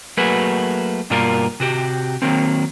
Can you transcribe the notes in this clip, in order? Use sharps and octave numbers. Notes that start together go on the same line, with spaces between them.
F#3 A3 A#3 F#4 G#4 B4
G2 B2 G3 A#3 F4 A#4
C3 F#4 G4
D#3 F#3 A#3 C4